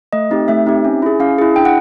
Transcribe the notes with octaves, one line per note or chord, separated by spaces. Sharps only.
A3 D#5
C4 D#4 G4
A3 E5
C4 D#4 G4
C#4
E4 G#4
C#4 F5
E4 G#4
D4 G5
F#5